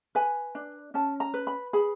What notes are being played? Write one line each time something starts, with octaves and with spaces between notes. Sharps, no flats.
B4 G#5
D4
C#4 A5
A#5
B4
B5
G#4 B5